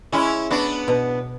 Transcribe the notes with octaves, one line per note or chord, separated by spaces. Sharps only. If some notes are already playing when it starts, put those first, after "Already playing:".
G#3 C#4 E4
B3 D4 F#4
B2